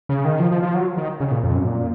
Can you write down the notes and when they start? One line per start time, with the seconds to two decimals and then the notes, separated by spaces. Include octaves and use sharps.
0.09 C#3
0.25 D#3
0.40 F3
0.51 F3
0.63 F3
0.75 F#3
0.98 D#3
1.20 C#3
1.31 A#2
1.43 F2
1.55 F#2
1.67 A#2